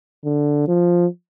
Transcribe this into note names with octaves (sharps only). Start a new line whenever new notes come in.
D3
F3